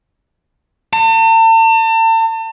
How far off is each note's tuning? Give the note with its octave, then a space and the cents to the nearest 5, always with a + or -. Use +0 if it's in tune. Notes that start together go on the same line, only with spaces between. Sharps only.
A5 +40